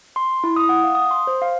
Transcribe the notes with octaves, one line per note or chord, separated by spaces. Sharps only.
C6
E4
D#6
F#5
F5
D#6
C6
C5
F5